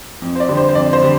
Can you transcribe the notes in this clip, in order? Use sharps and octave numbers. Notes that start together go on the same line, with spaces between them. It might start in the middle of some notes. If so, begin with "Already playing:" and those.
F2
C5
D5
D3 G3 C4
C5
C5
F2 D5
C5
D3 G3